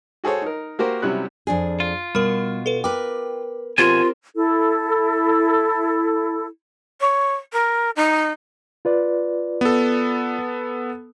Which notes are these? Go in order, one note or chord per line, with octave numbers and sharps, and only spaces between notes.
F#4 G#4 A4 C5 C#5
D#4 A#4
A#3 F#4 G4 A#4 C5
C3 F#3 G3 C#4 E4 F#6
F2 D4 G#4
F4
B2 G3 A#4
A4 B4
A#4 B4 G5 D6
B2 F3 C4 F4 G4 A#4 G#5 E7
E4 A4
C#5
A#4
D#4
F4 B4 D5
B3 A4